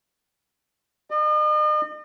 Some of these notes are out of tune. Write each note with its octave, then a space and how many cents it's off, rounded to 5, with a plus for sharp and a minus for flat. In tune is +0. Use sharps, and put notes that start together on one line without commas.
D#5 -45